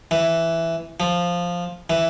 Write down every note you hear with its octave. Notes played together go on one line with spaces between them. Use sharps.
E3
F3
E3